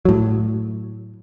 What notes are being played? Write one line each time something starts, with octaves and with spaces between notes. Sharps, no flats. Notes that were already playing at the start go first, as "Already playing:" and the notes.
A2 F#3